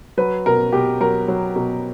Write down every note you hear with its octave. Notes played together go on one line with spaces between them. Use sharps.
F#3 B4
B2 A#4
B2 G4
F#3 A#4
F#3
B2